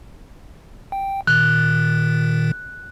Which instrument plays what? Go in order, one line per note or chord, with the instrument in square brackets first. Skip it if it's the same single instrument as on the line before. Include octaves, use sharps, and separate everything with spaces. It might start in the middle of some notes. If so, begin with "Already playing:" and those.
[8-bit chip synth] G5
[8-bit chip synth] A#2 D#3 [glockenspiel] F#6